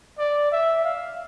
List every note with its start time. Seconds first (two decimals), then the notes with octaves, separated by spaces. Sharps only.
0.18 D5
0.52 E5
0.84 F5